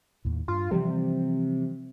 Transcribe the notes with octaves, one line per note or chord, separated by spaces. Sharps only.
D#2 A2
G2 F4
C3 E3 F3 G3